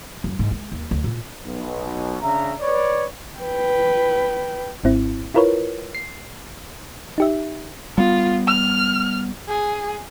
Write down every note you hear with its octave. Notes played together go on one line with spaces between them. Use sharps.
F#2
G#2
G#3
D#2
D2
A#2
B1 B2
C#3 D4 E5 A#5
B4 C#5 D5
B4 G5
G#1 G#2 C4 E4
E4 F4 A#4 B4 C#5
C7
D#4 G4 E5
G3 B3 F4
F6
G#4